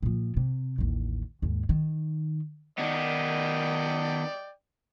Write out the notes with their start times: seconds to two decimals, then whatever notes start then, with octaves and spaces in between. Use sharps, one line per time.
0.03 A#2 F3
0.37 C3
0.78 A1 D#2
1.42 D#2 G#2
1.69 D#3
2.78 D#3 B3 D5 D#5 G5